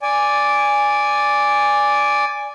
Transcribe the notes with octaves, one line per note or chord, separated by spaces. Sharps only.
D5 G#5